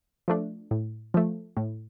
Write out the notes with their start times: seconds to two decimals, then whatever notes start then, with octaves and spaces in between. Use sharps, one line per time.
0.28 F3 A3 D4
0.71 A2
1.14 F3 A3
1.57 A2